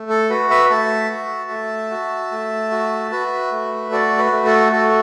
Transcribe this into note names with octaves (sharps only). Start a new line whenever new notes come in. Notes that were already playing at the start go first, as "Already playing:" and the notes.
Already playing: A3
A4
F#4 B4
B4 E5
A3 E5 A5
F#4
A3
F#4
A3
F#4
F#4 B4 E5
A3
F#4 A4 D5
B4
A3
A4
F#4 A4